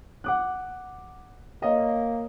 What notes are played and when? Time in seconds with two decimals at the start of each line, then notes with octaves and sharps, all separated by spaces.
0.24 F#5 D6 F#6
1.62 A#3 C#5 D#5 F5